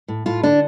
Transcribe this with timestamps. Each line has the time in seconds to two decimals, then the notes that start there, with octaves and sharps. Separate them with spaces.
0.08 A2
0.26 A2 F4
0.43 D3 D4